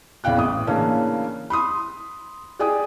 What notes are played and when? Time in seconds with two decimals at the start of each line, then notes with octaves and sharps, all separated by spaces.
0.24 E2 C#3 E4 F5 G5 F#6
0.38 A1 D#6
0.67 C#3 E3 A3 A#3 C#4 D4
1.50 B5 C6 D#6
2.59 G4 G#4 D5 G5 G#5 D#6